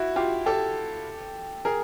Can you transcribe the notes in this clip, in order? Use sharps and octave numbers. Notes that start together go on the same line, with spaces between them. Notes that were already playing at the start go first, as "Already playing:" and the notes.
Already playing: E4 F#4
F4 G4
G4 A4
G#4 A#4